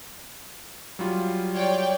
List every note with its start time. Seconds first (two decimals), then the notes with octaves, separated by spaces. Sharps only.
0.99 F#3 G3 F4
1.55 C#5 D5 G5